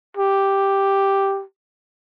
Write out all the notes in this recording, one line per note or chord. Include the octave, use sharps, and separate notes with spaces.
G4